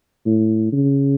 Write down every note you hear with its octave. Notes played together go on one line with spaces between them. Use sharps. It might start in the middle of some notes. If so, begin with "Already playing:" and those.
A2
C#3